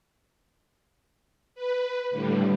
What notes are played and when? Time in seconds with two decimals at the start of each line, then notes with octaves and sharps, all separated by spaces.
1.55 B4
2.11 A2 D3 G3